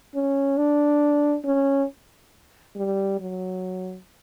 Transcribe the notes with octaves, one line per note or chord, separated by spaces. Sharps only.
C#4
D4
C#4
G3
F#3